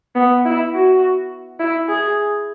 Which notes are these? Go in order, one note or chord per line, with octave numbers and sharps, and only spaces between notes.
B3
E4
F#4
E4
G#4